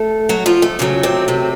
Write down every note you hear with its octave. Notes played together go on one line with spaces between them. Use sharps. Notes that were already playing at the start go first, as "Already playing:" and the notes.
Already playing: A3 A4
F#3 F#4
F3 F4
A3
D#2 C#3 F#3 A3 A#3
C3 C4
C3 C4